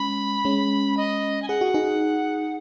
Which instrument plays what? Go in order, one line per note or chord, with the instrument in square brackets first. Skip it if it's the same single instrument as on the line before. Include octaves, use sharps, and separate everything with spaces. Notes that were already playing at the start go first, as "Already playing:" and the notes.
Already playing: [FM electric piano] G#3 C#4 [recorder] B5
[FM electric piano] G#3 C#4
[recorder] D#5
G#5
[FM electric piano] G#4 [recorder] F#5
[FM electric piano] F#4
D#4 G#4